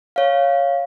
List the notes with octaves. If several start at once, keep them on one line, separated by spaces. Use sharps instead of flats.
C#5 F5